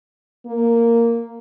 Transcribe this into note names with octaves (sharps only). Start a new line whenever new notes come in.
A#3